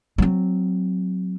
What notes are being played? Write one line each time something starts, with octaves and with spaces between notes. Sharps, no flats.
F#3 C4